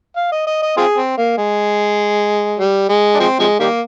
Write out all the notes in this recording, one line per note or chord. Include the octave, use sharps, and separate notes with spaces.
F5
D#5
D#5
D#5
C4 F4 G#4
C4
A#3
G#3
G3
G#3
D4
F3 G#3 C4
C3 F3 G#3
D#3 G3 A#3